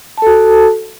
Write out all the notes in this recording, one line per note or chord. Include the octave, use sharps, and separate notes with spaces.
F#4 A4 A5